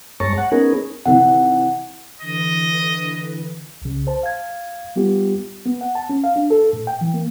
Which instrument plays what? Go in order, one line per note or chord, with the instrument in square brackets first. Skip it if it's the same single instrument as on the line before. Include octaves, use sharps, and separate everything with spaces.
[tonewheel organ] G2 G#3 C#5 A5 A#5 C#6
F#5
B3 C#4 D#4 G#4 A#4
[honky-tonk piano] C3 D#3 E3 [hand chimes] F#5
[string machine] D3 E3 B4 [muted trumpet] D#5
[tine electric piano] C2 C#3
C5 A5
F5 G#6
G3 B3 F4 G4
[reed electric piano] B3
F#5
A5
C#4
F5
D4
A4
A2
G5
E3
A#3